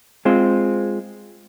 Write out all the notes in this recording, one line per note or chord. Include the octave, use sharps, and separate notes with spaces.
G#3 C4 F4 C5